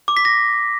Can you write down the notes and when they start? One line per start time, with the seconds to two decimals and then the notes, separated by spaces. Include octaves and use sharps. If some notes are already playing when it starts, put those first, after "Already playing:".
0.08 D6
0.17 B6
0.25 A#6